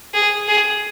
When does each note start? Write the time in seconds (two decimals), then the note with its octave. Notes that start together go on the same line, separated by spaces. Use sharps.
0.14 G#4
0.48 G#4